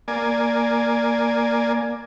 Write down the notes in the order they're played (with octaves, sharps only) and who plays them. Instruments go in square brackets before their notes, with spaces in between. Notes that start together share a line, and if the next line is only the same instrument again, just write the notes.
[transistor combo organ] A#3 D5 G#5